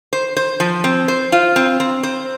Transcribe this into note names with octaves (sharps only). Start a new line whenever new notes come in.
C5
C5
F3
C4
C5
F4
C4
C4
C5